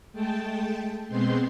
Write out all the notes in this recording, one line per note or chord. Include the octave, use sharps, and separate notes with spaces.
G#3 A3 G5 A5
B2 G#3 B3 C4 C6 G6